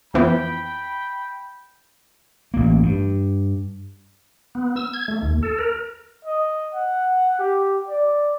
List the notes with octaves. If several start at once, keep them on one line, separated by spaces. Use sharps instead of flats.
F2 E3 B3 G5 B5
A1 A#3
G2
B3
E6
G#6
A3
D#2
A4
A#4
D#5
F#5
G4
D5